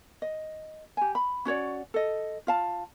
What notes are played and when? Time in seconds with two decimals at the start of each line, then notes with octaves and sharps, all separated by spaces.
0.22 D#5
0.97 G4 G#5
1.15 B5
1.45 C#4 F#4 C#5 D5
1.94 A4 D#5
2.47 F4 F5 A5